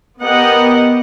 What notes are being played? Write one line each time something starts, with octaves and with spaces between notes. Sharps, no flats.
B3 G4 A#4 D#5 F#5